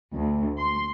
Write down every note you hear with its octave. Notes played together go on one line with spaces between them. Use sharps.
D2
C6